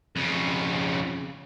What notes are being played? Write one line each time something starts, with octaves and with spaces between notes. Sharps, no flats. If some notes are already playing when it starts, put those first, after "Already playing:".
F2 C#3